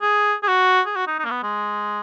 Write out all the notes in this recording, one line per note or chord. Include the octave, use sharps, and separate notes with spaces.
G#4
G#4
F#4
G#4
F#4
D#4
D#4
A#3
B3
G#3